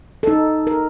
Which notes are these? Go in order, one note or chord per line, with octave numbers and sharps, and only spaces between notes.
D#4 A4
A#4